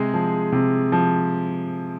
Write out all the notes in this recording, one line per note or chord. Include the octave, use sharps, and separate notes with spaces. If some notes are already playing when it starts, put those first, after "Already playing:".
Already playing: C3 G#3 G#4
F3
C3
F3